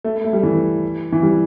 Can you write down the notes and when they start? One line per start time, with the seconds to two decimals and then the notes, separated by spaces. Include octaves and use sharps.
0.04 A3
0.24 A3
0.33 G3
0.43 E3
1.12 E3
1.23 G3